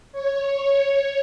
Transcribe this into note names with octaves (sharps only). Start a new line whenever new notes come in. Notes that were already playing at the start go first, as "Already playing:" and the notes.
C#5